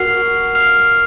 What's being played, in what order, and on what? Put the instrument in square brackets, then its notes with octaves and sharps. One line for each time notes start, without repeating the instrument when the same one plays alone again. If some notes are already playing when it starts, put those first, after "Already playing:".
Already playing: [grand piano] F#4 A#4 [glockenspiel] F6 C7 F7
[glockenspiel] F6 C7 F7